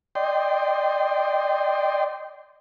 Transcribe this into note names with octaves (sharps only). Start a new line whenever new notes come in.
D5 D#5 G5 C6